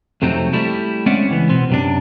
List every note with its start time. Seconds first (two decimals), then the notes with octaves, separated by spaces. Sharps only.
0.22 F2 C3 F#3 A3 C4 D#4
0.53 G3 A3 E4 G4
1.06 G#3 C4 C#4 D5 E5 F#5
1.29 C#2 E3 B3
1.49 B2 B3 C4
1.70 F#2 C3 D4